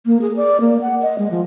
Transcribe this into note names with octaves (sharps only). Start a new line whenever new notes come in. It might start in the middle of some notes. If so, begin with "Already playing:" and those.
A#3
G#4
D5
A#3
F#5
D#5
G#3
F3